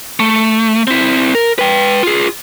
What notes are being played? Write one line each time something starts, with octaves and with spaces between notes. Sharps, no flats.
A3
C4 E4
A#4
B4 G5
F4 G#4